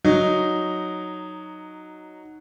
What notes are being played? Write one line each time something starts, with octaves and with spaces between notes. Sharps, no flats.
F#3 D#4